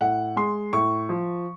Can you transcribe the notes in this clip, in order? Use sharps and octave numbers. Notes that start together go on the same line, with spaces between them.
A2 F#5
G#3 C6
A2 C#6
F3